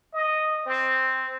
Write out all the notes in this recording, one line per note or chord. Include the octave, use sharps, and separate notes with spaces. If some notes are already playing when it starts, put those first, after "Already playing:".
D#5
C4